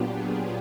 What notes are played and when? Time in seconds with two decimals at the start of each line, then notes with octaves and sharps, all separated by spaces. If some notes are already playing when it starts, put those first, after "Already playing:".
Already playing: A#2 F#3 B3 D4 F4 G4
0.11 G#4